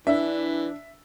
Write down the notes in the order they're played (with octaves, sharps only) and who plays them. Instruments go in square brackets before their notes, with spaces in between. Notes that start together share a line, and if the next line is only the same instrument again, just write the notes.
[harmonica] E3 [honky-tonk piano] D4 [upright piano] E5